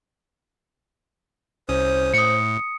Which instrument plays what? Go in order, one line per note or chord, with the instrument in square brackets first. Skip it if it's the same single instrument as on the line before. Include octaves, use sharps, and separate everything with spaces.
[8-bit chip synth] C2 C#4 D#6 [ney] C5
[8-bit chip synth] A2 [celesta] D#6 C#7